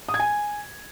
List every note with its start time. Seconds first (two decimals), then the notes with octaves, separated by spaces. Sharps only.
0.08 D#6
0.14 G#6
0.20 G#5